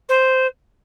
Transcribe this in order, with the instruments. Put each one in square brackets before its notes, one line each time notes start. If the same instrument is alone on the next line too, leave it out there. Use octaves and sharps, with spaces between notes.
[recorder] C5